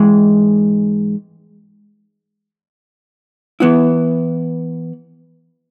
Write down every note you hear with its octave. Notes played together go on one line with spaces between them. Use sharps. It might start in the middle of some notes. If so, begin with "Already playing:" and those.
Already playing: G#2 E3 G#3
E3 B3 E4